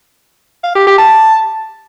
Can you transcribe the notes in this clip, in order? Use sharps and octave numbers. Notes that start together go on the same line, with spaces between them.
F5
G4
G4
A5